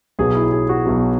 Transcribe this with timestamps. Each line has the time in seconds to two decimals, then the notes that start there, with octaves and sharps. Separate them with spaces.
0.19 B1 B2 F#3 G#4
0.35 E4
0.52 G#4
0.69 F#4
0.86 B1 B2 F#3